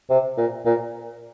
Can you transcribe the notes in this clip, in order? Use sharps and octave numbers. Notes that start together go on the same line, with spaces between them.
C3
A#2
A#2